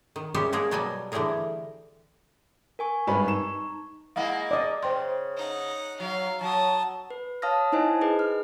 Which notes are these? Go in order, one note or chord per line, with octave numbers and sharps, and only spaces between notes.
D#3
G3 G#3 C#4 G4 E5
G#3 A#3 G#4 A#4
B2 F#3 G3 D5 D#5 G#5
D3 E3 G3 A3 G#4 A#4
A#4 G#5 C#6
G#1 G2 B4
D#4 A#5 C#6 E7
G#3 A#3 E4 F5 F#5
D5 D#5
C#3 C5 G5 C6
D#4 F#5
F#3 F5
F#3 A5 D#6
B4
C#5 F5 A5 D#6 F6 A#6
D#4 E4 C5 D#5 G#5 A5
G#4 B4 D#5
F6